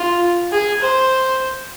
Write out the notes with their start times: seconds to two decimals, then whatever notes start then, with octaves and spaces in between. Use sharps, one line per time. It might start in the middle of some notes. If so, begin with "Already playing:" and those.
Already playing: F4
0.52 G#4
0.82 C5